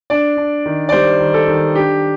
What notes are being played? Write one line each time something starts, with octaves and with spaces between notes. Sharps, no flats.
D4 D5
D4
D#3
D5
G3 C5
D#3
A4
D#3
D4 G4